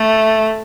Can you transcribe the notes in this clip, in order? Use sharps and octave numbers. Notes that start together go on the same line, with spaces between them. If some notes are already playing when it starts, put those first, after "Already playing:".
Already playing: A3